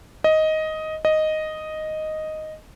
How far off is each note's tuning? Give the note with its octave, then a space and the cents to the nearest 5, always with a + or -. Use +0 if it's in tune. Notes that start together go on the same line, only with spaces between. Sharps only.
D#5 +10
D#5 +0